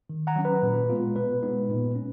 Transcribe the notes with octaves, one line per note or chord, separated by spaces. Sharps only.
D#3
F#5 A#5
F#3 C#4
B4
A#2
G#3 B3 F4
B2 B4
G#3 B3 D#4
A#2
C#4